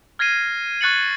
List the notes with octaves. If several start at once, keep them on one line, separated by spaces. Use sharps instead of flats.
F6 G#6 A#6 C7 D#7
C#6 F#6 A6 C#7 F#7